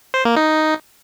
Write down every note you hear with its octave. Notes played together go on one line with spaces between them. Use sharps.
C5
A#3
D#4